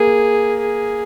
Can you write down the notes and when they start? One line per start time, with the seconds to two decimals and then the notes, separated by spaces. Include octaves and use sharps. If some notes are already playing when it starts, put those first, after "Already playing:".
Already playing: A#3 G#4
0.60 G#4